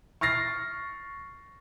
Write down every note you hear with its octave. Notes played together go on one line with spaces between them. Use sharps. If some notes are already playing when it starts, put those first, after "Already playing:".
C#6 F6 A6 A#6 C7